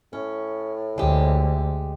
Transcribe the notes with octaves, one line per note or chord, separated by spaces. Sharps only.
A2 C#4
D2 G#3 G4